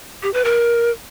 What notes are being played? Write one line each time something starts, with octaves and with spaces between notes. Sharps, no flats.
G4
B4
A#4